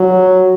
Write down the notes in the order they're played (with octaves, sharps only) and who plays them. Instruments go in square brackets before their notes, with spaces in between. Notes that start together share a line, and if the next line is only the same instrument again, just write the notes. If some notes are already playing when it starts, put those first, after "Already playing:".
Already playing: [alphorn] F#3